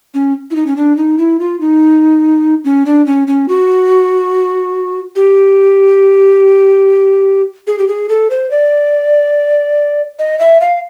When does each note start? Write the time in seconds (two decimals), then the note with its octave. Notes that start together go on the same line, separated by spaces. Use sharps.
0.14 C#4
0.51 E4
0.56 D#4
0.67 C#4
0.77 D4
0.97 D#4
1.18 E4
1.40 F4
1.60 D#4
2.65 C#4
2.86 D4
3.06 C#4
3.27 C#4
3.49 F#4
5.16 G4
7.67 G#4
7.78 G4
7.88 G#4
8.09 A4
8.30 C5
8.51 D5
10.19 D#5
10.39 E5
10.61 F5